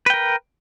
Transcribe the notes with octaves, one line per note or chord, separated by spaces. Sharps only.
A#4 B4 G5